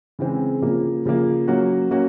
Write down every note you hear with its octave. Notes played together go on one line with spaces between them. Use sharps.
C#3 E3 G#3 C4
C#3 F3 A#3
C#3 F3 A#3
F#3 A#3 C#4 F#4
F#3 A#3 C#4 F#4